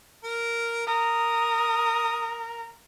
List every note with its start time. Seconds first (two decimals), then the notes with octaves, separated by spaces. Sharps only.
0.23 A#4
0.87 A#4 D#6